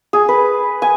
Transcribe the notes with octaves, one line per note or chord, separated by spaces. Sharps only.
G#4
B4
G#5